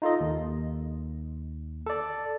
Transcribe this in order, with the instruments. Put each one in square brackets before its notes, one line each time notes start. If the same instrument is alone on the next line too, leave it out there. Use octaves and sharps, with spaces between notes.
[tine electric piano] D#4 F4 A4 D#5
D#2
A4 D5